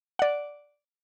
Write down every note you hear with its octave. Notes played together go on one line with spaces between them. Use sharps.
D5 F#5